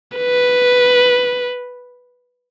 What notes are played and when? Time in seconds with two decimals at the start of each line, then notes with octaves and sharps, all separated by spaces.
0.17 B4